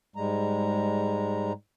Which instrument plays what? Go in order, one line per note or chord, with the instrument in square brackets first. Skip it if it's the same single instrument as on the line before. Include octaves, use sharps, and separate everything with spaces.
[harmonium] G#2 G3 G#3 A#5